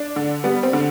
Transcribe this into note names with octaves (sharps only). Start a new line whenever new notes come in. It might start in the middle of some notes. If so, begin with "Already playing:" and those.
Already playing: D4
D3
G3 B3
C4
D3